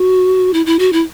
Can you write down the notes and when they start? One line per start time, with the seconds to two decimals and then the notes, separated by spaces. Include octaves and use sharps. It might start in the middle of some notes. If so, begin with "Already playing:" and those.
Already playing: F#4
0.53 E4
0.66 E4
0.79 F#4
0.93 E4